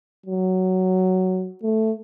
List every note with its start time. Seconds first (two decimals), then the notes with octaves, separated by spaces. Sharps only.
0.26 F#3
1.63 A3